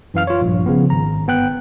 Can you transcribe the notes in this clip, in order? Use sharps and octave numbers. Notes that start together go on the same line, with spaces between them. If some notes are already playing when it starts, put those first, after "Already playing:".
F#2 E3 F5 F6
F4 C#5
A#1 G2
C#3 F3 B3
G#1 A#5
G1 B3 G5 F#6